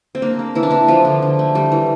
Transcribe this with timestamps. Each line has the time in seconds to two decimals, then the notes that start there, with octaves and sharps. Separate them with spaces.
0.15 C4
0.22 A#3 D4
0.39 A#3
0.55 E3 E4
0.63 D4
0.71 E3 E4
0.88 F3 F4
1.05 D3
1.22 D3
1.39 A3
1.55 G3
1.72 E3